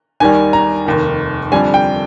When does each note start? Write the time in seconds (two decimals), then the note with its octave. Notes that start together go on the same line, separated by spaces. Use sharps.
0.20 D#2 D#3 G3 G#5
0.53 A#5
0.86 F1 D#2 D#3
1.52 F2 D3 G3 G#5
1.74 G5